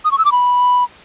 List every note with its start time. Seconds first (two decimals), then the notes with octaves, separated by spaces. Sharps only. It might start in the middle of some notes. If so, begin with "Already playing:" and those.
0.05 D#6
0.12 C#6
0.18 E6
0.25 D6
0.32 B5